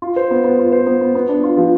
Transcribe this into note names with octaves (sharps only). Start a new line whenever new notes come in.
F4
C5
B3
B3
F4
C5
B3
B3
B3
D4
F4
F3